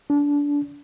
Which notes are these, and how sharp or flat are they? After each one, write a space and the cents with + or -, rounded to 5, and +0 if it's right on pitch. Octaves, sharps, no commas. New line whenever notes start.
D4 -25